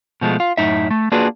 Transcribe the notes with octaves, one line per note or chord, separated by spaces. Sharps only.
B2 F3 G#3 A3
F4
F#2 A2 D#4 E5
A3
A#3 D4 F4 F#4 G#4 B4